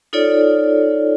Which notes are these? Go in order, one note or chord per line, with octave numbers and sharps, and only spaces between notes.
D#4 F4 A4 C#5 D5